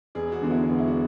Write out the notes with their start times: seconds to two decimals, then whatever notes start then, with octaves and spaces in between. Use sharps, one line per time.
0.15 E1 G#4
0.32 F#4
0.42 E2 D3 G#3 B3
0.51 E4
0.68 E1 F#4
0.79 E4
0.87 F#4